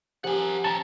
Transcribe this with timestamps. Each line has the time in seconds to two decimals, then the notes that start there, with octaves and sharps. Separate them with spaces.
0.24 F3 G4 A#4 F#5 G#5
0.65 C#4 G4 A5 A#5